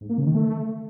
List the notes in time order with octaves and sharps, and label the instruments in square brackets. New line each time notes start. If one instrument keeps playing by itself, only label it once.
[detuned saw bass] G#2
A#3
C#3
D#3
A3